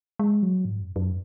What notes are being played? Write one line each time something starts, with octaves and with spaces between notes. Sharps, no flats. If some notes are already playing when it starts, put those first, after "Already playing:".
G#3
F#3
G#2
F#2
F#2